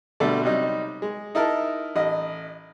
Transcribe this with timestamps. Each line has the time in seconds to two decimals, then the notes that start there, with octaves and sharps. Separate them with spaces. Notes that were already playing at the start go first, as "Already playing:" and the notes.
0.20 B2 D3 G3 A3 A4
0.42 C3 F#3 G3 D#4
1.02 G#3
1.35 D#4 E4 A#4 A5
1.96 A1 D#5